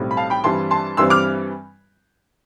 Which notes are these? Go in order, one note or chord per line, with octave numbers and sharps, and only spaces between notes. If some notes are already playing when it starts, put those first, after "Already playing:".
Already playing: B1 A2 G3 C4
B5
F5 A5
G5 B5
G2 E3 G3 C4 A5 C6
A5 C6
G2 E3 G3 C4 C6 E6
D6 F6